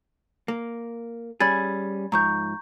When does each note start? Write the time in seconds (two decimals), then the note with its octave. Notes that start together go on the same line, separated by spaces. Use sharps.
0.48 A#3
1.40 G3 C#4 G#4 B5 G#6 A6
2.12 G#2 F3 A#5 C#6 G6